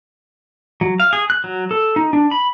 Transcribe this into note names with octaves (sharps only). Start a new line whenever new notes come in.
F#3
F5
G#4
F#6
F#3
A4
D#4
D4
B5